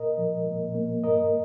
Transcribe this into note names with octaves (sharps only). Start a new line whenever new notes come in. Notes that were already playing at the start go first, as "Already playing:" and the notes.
Already playing: A#2 A#4 D#5
F3
A#2
A#3
G2 A#4 D#5